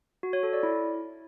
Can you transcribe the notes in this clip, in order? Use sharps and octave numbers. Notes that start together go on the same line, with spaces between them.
F#4
C#5
A4
D5
E4